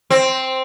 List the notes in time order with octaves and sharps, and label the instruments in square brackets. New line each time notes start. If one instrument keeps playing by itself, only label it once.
[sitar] C4